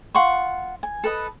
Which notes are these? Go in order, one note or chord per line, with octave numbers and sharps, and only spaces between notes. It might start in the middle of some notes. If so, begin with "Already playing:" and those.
F4 F#5 C6 C#6
G#5
A4 B4 D#5